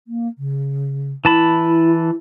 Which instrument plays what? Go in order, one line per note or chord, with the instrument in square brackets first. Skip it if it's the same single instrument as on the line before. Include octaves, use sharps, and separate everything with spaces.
[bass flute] A#3
C#3
[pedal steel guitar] E3 A5 B5 [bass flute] E4